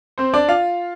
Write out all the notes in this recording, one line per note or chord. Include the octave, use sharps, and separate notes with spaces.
C4 C5
D4 D5
F4 F5